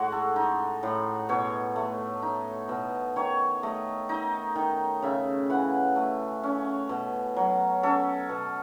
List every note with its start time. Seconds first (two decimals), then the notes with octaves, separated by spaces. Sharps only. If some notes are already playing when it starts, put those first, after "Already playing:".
Already playing: A2 G#3 F#4
0.12 A4
0.36 D#4
0.83 A2
1.29 B2 C#5
1.76 A3
2.22 D#4
2.69 B2
3.16 D#3 C#5
3.63 A3 D#5
4.09 D#4 D#5
4.56 D#3
5.02 C#3 E5
5.49 E3 F#5
5.96 A3
6.43 C#4
6.89 B2
7.36 F#3
7.83 C#4 A4
8.29 B2